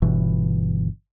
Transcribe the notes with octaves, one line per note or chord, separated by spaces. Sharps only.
G1 B2 E3